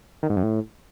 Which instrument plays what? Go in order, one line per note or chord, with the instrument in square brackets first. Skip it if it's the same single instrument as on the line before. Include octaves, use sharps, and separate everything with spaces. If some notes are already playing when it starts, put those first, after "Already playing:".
[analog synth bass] D#3
G#2
F#2
A2